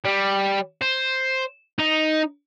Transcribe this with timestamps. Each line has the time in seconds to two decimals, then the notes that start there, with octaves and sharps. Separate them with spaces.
0.05 G3
0.81 C5
1.79 D#4